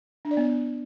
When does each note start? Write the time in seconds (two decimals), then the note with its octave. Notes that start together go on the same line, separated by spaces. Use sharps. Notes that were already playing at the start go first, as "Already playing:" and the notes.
0.25 D4
0.31 D5
0.37 B3